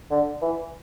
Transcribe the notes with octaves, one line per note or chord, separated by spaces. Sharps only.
D3
E3